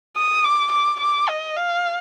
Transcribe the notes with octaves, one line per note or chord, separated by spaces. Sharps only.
D#6
D6
D6
D6
D#5
F5